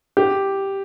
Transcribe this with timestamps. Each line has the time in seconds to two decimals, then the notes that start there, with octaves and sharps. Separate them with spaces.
0.17 G4